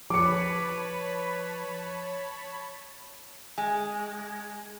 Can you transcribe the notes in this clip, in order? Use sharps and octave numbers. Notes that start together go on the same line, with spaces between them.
F3 B4 C#5 A5 B5 D6 C#7
G#3 G#5